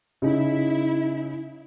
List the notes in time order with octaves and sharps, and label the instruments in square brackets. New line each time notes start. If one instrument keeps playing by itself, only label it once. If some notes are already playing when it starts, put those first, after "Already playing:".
[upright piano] C#3 D#4 [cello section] E4